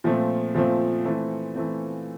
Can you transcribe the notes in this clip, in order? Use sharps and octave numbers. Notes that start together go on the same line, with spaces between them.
A#2 F3 A3 C4
A#2 F3 A3 C4
E3 A3 C4
E3 A3 C4